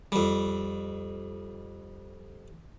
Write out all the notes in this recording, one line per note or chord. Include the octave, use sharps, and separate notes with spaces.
F2 G3